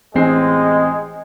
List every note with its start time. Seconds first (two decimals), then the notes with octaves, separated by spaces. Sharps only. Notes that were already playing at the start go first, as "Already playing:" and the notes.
0.15 A1 G#3 C4 C7